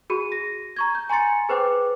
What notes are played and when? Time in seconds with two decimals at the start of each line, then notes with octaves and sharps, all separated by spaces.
0.10 F#4 G#4 B5 D#7
0.32 A#6
0.76 A#5 C#6 G#6
0.95 G6
1.10 G#5 A#5 C6 A6 C#7
1.49 G#4 B4 C5 G5 D6